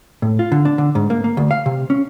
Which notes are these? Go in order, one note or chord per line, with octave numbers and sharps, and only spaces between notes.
A2
F4
D3
D4
D3
G#2
A#3
A#3
D2
F5
C3
C#4